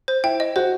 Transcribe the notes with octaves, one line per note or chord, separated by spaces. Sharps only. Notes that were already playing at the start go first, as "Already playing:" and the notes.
C5
E4 G5
D#5
F#4 C5